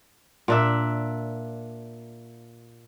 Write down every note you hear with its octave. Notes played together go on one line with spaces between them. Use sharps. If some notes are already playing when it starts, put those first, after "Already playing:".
A#2 D4 E5